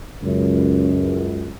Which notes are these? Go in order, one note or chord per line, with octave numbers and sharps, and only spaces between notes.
C#2 F#2